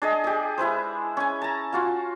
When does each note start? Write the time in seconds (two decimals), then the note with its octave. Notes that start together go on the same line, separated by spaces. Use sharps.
0.02 D4 G#4 D#5
0.24 G4 G#4
0.58 G#3 E4 B4 C5
1.17 C#4 G#5
1.42 A5 A#5
1.73 F4 F#4 F5